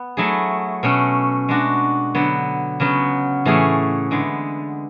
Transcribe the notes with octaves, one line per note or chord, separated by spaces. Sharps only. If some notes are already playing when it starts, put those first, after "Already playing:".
Already playing: B3
F#3 A3 E4 G#4
B2 A3 C#4
G#3 D4 F#4
D3 F#3 B3
C#3 F#3 B3
A2 E3 A3 C#4 G#4
D3 G#3 B3